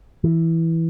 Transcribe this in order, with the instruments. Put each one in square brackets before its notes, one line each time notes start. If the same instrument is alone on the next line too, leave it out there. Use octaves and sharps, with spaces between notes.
[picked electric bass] E3